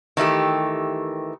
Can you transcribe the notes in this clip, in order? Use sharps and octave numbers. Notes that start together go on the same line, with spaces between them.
D#3 E3 A3 G4